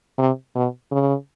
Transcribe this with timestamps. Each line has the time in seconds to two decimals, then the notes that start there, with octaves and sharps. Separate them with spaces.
0.19 C3
0.55 B2
0.92 C#3